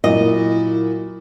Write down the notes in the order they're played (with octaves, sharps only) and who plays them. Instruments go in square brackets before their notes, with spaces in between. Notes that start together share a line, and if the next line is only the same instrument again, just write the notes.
[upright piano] A#2 F#3 [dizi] E4 [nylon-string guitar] D#5